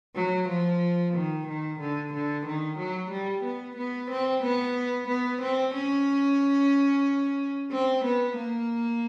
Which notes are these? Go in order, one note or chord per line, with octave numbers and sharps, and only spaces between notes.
F#3
F3
D#3
D#3
D3
D3
D#3
F#3
G3
B3
B3
C4
B3
B3
C4
C#4
C4
B3
A#3